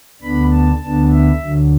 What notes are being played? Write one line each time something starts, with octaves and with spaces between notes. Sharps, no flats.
D2 D3 B3 D4 B5
A5
D2 D3 B3 D4 A5
E5
D2 D3 F#3